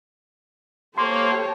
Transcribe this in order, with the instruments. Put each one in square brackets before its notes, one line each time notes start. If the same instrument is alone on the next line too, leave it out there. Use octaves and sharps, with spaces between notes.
[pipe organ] A#3 [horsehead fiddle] G4 A4 [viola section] C5 C#5 [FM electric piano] C6